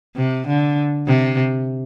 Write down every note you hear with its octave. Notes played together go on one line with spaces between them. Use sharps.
C3
D3
C3